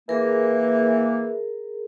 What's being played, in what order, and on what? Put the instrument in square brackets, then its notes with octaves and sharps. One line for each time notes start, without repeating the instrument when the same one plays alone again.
[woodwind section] E3 A#3 [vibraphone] G#4 A#4